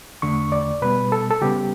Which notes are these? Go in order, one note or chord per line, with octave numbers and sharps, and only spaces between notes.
E2 D3 A3 C#6
D5
B2 G3 B3 B4
A4
A4
C#3 G3 B3 G4